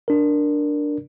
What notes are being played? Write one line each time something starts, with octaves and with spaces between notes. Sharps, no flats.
D4 A#4